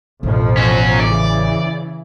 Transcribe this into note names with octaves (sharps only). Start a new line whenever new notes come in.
A1 F2 B2 F3
C#4 F#4
C#3 E3 D5